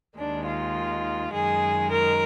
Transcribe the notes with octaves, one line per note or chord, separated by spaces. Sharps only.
D#2 D#3 G#3 D4
F4
F#2 D#3 G#3 G#4
A#4